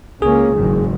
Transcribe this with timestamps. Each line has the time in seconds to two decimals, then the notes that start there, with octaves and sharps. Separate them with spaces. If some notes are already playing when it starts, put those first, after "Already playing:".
0.22 C#2 A#3 C#4 G#4
0.55 F#1 G#2 D#3